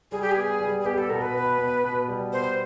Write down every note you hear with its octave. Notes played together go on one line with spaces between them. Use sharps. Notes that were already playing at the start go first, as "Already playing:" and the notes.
G3 G#4
G4
B3 G#4
G3
G#4
B3 G4
A4
B2 A#4
B4
B3
B3
B2
G3
B3 C5